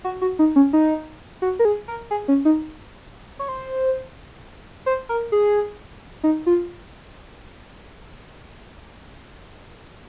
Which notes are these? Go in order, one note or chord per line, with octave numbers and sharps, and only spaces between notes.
F#4
F#4
D#4
C#4
D#4
F#4
A#4
G#4
A#4
G#4
C#4
D#4
C#5
C5
C5
A#4
G#4
D#4
F4